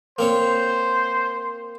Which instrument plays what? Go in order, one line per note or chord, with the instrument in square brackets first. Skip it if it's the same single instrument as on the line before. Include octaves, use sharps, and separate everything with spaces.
[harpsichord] A#3 C4 C#5 [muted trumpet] C5